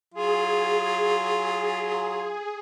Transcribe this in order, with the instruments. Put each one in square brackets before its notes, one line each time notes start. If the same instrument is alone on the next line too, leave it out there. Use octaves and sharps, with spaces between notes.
[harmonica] F#3 F4 [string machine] G#4